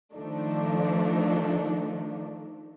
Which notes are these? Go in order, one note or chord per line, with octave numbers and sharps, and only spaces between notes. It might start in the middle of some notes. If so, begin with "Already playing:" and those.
D#3 F3 A3 D4 D#4